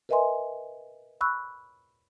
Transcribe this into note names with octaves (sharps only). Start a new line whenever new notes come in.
A#4 B4 D#5 E5 G#5 C6
B5 C#6 E6 F#6